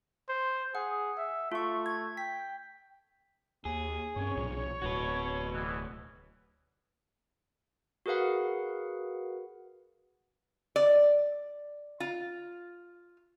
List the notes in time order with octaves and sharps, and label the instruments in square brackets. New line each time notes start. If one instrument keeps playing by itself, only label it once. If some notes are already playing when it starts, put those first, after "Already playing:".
[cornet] C5
[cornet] G#4 [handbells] F#5
[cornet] E5
[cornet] A3 [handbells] F4 C#6
[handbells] G#6
[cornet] G5 [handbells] B6
[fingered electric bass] D#2 [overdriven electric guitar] G#4
[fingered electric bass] G2 C#4 [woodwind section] C#5
[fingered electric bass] B1 A#2
[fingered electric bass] D1 [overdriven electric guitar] F#4 B4
[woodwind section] B2 E3
[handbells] F#4 G#4 A#4 B4 F5 F#5
[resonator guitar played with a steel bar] D5
F4